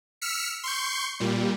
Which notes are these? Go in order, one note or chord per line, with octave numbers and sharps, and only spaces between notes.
E6 F6 B6 C#7
C6 C#6 G6
A#2 G3